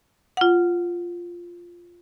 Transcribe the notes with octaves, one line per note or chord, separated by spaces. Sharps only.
F4 F#5